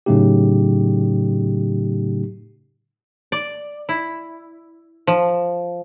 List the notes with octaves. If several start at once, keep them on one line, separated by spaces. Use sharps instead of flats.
A2 C#3 F#3 A3 D#4 G4
D5
E4
F3